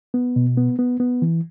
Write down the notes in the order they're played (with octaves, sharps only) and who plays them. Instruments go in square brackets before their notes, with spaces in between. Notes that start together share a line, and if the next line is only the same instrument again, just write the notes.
[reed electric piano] B3
B2
B3
B3
B3
E3